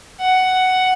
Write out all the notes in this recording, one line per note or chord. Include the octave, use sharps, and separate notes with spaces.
F#5